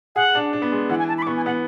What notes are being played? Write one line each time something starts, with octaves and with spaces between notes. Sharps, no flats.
G#4 F#5
D4
D4
B3
G#3
E3 F#5
G#5
A5
B5
D6
B3 C#6
G#5
B3 F#5